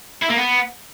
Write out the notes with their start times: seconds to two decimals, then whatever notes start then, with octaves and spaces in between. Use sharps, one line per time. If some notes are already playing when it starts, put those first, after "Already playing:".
0.23 E4
0.30 A#3
0.37 B3